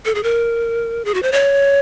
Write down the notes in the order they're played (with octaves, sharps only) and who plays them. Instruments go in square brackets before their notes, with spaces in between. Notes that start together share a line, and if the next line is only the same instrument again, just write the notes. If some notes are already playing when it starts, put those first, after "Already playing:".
[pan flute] A4
G#4
A#4
G#4
F#4
C5
C#5